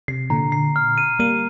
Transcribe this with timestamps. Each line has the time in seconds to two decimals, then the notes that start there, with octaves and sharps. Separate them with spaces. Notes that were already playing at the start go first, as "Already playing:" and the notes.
0.08 C3 C7
0.30 A#2 D3 A#5
0.52 C7
0.76 F6
0.98 D#7
1.19 G3 A#3 D#7